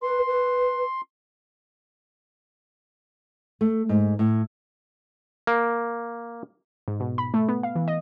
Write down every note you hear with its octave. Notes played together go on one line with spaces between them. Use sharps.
B4 C6
B4
A3
G#2
A2
A#3
G#2
B2
B5
A3
B3
F5
E3
D#5